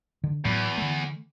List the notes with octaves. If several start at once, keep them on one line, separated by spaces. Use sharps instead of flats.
D3
E2 A2 F#3 B3
D3 A3